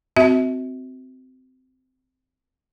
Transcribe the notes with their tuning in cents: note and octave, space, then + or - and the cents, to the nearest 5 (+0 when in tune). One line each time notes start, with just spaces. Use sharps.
C4 -20 F#4 +0 E5 -35